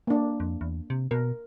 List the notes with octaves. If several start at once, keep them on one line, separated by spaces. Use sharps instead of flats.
A#3 D4
F2
E2
C3
B2 A#4